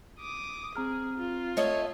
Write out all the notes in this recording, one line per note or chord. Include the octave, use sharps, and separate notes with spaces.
D6 D#6
C4 G#4 A#5 F6
F4
A3 C#5 D#5